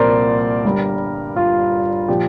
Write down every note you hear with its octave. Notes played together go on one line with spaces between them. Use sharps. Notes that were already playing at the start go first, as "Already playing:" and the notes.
Already playing: C2 A#2 F3 C4 A#4 C5 D5
G1 G2 G3
F4
A#2 F3 G4